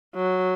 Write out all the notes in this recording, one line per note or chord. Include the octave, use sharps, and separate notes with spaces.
F#3